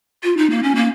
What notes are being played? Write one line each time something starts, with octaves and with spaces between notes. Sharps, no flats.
F4
D#4
A#3
C#4
A#3